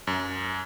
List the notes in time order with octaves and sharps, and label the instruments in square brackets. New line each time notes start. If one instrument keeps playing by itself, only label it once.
[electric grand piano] F#2